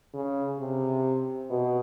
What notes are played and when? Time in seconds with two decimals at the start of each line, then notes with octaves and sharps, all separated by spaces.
0.14 C#3
0.60 C3
1.50 B2